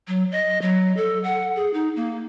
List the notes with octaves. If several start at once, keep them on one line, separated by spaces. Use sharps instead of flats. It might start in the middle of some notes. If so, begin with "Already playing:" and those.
F#3
D#5
F#3
A4
F#5
G#4
D#4
A#3